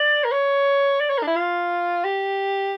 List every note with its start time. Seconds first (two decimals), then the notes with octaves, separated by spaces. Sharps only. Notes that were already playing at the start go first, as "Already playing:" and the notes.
Already playing: D5
0.24 A#4
0.32 C#5
1.01 D5
1.10 C#5
1.18 A#4
1.23 D4
1.27 E4
1.36 F4
2.04 G4